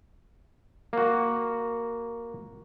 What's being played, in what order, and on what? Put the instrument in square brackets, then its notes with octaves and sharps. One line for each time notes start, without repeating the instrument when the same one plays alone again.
[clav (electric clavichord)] A#3 F#4